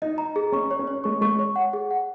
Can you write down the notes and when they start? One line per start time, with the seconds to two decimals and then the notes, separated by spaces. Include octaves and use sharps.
0.02 D#4 D#5
0.18 A#5
0.36 G#4
0.52 C#4 C#6
0.71 C#5
0.79 C#4
0.87 C#5
1.04 G#3 C#6
1.21 G#3 C#6
1.39 C#5
1.56 F#5
1.73 G#4
1.91 F#5